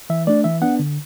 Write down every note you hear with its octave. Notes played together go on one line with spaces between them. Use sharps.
E3 E5
A3 D4 D5
E3 E5
B3 D4 F#5
D3